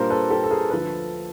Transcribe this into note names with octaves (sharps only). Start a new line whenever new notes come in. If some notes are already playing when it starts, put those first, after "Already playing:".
Already playing: A#2 G3 A#3 D4 A#4 C5
A4 B4
G4 A4
A4
G#4 A#4
D2 D3 F3 A4 B4